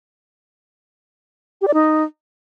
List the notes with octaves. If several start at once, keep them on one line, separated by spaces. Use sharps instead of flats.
G4
D5
D#4